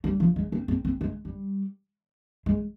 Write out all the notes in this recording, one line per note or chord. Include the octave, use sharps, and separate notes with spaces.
G3
F3
G#3
C4
C4
C4
G#3
G3
G#3